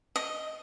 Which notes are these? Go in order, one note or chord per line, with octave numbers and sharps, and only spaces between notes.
D#5